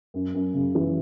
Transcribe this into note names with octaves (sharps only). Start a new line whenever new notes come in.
F#2
F#2
C#3
E3